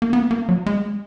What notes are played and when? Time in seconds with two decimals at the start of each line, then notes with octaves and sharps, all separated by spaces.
0.02 A#3
0.13 B3
0.31 A#3
0.49 F#3
0.66 G#3